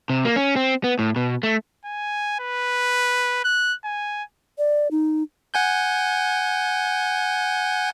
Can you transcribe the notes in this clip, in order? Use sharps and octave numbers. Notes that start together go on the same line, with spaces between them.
C3
A#3
C#4
C4
B3
A2
B2
A3
G#5
B4
F#6
G#5
D5
D#4
F#5 G#5 G6